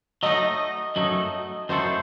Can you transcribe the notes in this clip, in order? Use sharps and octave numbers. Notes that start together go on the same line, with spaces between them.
F#3 A3 D#4 D#5
F#2 F#3 A3 D#4
F#2 F#3 A3 E4 A4 C5